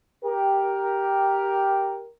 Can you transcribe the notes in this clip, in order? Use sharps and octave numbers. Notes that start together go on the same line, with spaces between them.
G4 A#4